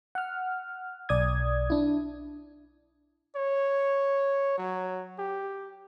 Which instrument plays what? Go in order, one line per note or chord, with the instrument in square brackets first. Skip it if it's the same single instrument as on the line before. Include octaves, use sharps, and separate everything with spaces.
[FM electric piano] F#5 F6
B1 D5 D#6 G#6
D4 E4
[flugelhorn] C#5
F#3
G4